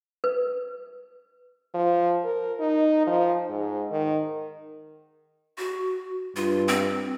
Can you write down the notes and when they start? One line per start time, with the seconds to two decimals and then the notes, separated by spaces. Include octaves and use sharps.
0.24 B4
1.74 F3
2.25 A#4
2.60 D#4
3.07 F3
3.49 G#2
3.91 D#3
5.58 F#4
6.36 G2 F4
6.68 C4